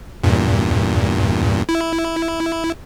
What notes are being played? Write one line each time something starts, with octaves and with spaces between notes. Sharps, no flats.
E2 G2 A#2
E4